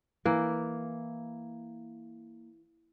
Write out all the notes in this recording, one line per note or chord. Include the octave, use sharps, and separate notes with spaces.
E3 A#3